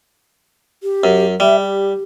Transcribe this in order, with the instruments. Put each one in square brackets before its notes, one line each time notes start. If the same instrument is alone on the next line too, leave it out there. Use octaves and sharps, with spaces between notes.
[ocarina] G4
[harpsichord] F#2
[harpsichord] G3 [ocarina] E5
[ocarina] G4